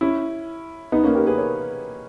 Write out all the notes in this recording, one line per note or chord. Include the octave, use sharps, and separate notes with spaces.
C#4 E4
B3 D#4
A#3 C#4
G4 A#4
G#4 B4
A#4 C#5